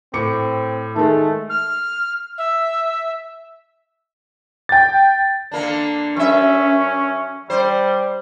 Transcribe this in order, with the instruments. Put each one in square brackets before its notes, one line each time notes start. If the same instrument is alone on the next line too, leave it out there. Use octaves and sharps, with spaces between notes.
[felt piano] A2 D6 C#7 [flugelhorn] C4
[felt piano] D#3 G#3 [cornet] A3 [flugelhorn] A4
[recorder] F6
E5
[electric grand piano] G5 A6
[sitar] D3 A#3 D4
[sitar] F#2 E5 [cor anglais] C#4
[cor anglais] G3 [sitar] C5